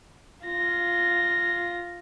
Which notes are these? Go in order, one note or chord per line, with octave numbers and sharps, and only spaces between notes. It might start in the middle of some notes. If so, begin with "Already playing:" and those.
F4 A#6